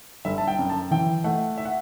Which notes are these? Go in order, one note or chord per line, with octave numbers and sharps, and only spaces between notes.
G1 E5
A5
G5
F#2
A5
E3 G5
A3 F#5
E5
F#5